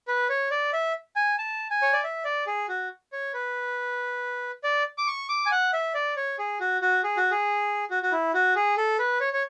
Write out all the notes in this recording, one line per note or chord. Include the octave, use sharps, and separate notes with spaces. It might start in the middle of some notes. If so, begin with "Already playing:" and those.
B4
C#5
D5
E5
G#5
A5
G#5
C#5
D5
E5
D5
G#4
F#4
C#5
B4
D5
D6
C#6
D6
G#5
F#5
E5
D5
C#5
G#4
F#4
F#4
G#4
F#4
G#4
F#4
F#4
E4
F#4
G#4
A4
B4
C#5
C#5